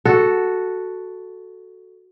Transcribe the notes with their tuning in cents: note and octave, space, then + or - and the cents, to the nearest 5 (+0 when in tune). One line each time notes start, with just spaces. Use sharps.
F#4 +0 A4 +0